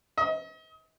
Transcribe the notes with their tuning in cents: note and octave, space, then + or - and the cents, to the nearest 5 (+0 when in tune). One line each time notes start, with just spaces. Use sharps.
D#5 +40